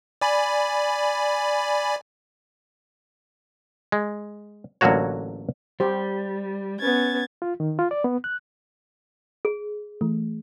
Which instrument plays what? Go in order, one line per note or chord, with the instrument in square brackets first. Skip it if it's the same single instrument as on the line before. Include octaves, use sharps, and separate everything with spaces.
[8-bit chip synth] D5 G#5 B5
[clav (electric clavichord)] G#3
A1 D3 F#3 A#3 F#4 C#5
[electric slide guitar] G3 [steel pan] G4 C5
[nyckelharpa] B3 C#4 [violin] G#6 A6
[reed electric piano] F4
D#3
F4
D5
B3
F#6
[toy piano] G#4
[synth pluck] E3 A3